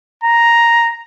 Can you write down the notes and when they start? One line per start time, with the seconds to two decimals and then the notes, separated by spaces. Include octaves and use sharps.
0.23 A#5